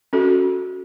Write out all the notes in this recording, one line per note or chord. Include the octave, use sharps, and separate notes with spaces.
C#4 F#4 A4